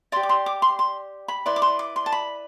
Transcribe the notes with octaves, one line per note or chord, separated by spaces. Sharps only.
G4 D5 C6
D6
C6
D6
C6
C6
B5
E4 B4 D5 C6
D6
C6
D6
C6
A5
B5